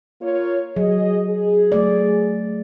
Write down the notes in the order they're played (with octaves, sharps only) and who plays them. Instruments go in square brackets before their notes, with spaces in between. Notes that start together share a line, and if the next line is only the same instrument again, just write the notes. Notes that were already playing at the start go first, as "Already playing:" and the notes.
[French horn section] A#3 F4 C#5
[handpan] F#3 [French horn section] G#4 D#5
[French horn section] G#4
[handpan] F#3 A3 D5